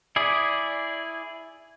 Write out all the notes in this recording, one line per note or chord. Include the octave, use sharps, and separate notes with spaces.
E4 G#4 D5